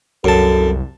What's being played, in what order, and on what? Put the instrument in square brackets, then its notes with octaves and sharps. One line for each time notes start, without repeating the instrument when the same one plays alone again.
[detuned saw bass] C2 [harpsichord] F#2 A5 [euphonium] A4